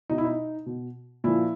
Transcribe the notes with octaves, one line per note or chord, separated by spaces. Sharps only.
B2 D#4
E4
D#4
B2
A#2 F3 E4